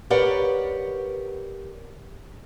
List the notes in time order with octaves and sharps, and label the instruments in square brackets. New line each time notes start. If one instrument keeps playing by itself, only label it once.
[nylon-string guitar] G4 A#4 B4 C#5 D5 F#5